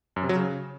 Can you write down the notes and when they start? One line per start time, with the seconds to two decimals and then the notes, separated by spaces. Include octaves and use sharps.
0.16 F#2
0.23 C3
0.29 F#3
0.36 C#3